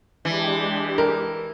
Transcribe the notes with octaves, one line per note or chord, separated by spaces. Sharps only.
E3 G#3 D4 G4
A#4